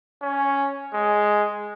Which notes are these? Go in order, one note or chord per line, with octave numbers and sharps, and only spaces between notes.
C#4
G#3